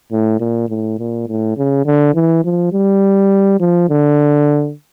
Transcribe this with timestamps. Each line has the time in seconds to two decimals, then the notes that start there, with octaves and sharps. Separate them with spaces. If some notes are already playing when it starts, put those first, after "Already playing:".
0.12 A2
0.40 A#2
0.69 A2
0.99 A#2
1.28 A2
1.58 C#3
1.86 D3
2.14 E3
2.45 F3
2.73 G3
3.60 F3
3.89 D3